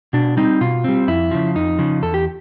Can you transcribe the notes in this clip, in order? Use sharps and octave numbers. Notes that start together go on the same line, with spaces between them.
B2 D4
G3 C4 D#4
B2 F4
G3 C4
F2 E4
C#3 F3
F2 D#4
C#3 F3
E2 A4
G4